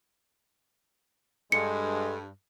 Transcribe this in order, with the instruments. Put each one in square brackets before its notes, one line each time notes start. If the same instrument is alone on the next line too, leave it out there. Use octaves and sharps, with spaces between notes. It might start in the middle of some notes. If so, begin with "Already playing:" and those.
[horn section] G2 [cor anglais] G#3 [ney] A4 [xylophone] C#7